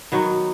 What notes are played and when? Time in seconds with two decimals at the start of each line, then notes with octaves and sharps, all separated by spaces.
0.12 D#3 F#3 B3